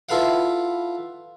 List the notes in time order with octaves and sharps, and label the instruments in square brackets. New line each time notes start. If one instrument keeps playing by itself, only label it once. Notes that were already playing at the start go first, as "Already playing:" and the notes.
[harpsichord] E4 F4 A4 B4 F5 F#5